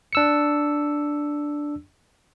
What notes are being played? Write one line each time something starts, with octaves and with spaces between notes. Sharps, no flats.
D4 E6 C#7